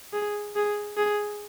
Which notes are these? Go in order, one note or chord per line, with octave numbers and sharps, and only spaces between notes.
G#4
G#4
G#4